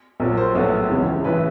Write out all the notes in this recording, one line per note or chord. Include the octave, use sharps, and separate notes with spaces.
A#1 A#2 F#3 A#4
C5
A#1 A2 F#3 B3 C#5
C#2 C#3 E3
A1 E3 B4